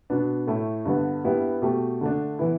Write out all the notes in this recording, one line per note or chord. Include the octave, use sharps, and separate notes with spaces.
B2 B3 D4
A2 A3 E4
G2 D3 B3
G2 G3 B3 E4 G4
B2 A3 G4
D3 A3 D4
E3 B3 E4